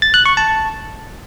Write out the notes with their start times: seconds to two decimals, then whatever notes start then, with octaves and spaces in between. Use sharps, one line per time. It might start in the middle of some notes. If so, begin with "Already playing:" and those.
0.02 A6
0.14 F#6
0.26 C#6
0.37 A5